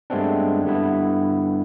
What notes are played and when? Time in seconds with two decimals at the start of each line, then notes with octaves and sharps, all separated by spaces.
0.10 G2 G#3 A3 B3 C4 D4
0.65 G2 D3 B3 E4